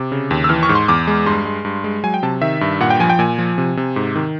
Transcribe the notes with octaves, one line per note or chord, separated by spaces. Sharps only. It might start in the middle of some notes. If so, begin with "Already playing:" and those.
Already playing: C3 D6
C#3
D#2
E6
E3 F6
C#6
G#2
C6
E2 D6
G#3
G2 C6
G#3
G2
G#3
F#3 G#5
G5
C3 A5
D#3 E5
G2
A#2 F#5
G5
F3 G#5
G5
A#2 G#5
F3
C3
C3
G#2
D#3